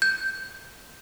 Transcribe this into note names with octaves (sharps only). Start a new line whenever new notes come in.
G6